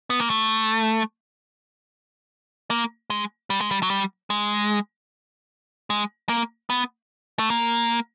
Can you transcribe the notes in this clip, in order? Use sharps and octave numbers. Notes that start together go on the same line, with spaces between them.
B3
A#3
A3
A#3
G#3
G3
G#3
G3
F#3
G3
G#3
G#3
A#3
B3
A3
A#3